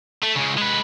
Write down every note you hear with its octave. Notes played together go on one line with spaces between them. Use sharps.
A3
C#2 C#3
G#3 B4